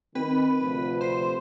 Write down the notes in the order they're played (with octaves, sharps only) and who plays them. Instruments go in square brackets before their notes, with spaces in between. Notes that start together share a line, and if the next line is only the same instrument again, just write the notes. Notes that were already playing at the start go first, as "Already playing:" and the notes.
[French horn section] D#3 [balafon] C4 [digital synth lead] B4
[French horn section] D2 C3 F3
[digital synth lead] C5